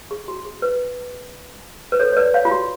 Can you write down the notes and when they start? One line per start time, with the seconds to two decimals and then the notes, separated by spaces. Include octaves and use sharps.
0.11 G#4
0.28 F#4
0.45 G#4
0.62 B4
1.92 B4
1.99 A4 C#5
2.12 C#5
2.17 B4 D5
2.34 C#5 F5
2.45 F4
2.51 F#4